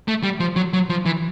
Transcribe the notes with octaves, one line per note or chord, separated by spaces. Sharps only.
A3
G3
F3
F#3
F#3
F3
E3